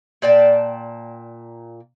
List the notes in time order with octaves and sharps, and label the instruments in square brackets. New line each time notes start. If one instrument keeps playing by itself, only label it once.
[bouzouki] A#2 D5 G5 A5